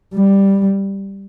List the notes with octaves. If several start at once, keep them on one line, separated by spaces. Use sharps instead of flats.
G3